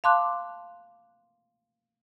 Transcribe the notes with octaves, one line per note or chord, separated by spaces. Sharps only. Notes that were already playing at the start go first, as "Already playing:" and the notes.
F5 A5 C6 D6 F#6